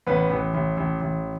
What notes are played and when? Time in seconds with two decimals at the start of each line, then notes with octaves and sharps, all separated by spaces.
0.07 A1 B3 B4
0.30 A1
0.54 A1
0.77 A1
1.01 A1